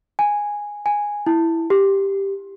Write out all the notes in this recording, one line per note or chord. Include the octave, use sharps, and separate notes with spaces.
G#5
G#5
E4
G4